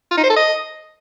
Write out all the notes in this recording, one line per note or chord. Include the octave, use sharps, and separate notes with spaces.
F4
D#4
C5
A4
D#5